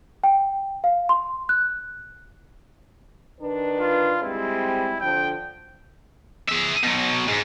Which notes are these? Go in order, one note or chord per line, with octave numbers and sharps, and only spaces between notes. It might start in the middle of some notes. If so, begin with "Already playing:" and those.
G5
F5
C6
F#6
D#3 D4 B4
F4
G3 G#3 C4 E4
D3 F3 G5
G#4 E5
B2 F#3
G#2